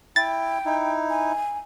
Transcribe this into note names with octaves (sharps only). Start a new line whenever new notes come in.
E4 G5 A6
D#4 E4
G#5